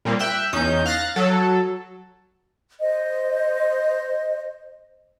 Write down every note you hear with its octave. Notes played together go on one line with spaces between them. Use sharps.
A#2 G3 A#3 C4
E5 G5 E6 F#6
E2 C#4 D#4 G6
F5 F6 F#6 A6 A#6
F#3 A4
C5 D#5